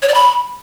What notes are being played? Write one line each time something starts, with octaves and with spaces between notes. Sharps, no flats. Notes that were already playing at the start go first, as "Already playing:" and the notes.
C#5
D5
B5